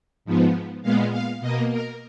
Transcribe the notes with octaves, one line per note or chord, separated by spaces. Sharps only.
G#2 F3 B3
A#2 G#3 B3 F5
F5
B2 A#3 D#5
A#4